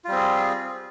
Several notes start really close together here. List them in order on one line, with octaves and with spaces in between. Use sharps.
F4 G3 C4 G#4